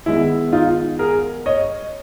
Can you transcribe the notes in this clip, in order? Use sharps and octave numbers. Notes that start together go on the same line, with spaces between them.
D#3 G#3 B3 E4
D#4 F4
G#4 A#4
C#5 D#5